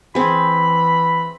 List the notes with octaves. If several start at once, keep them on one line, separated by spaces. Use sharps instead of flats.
E3 C4 G#4 B5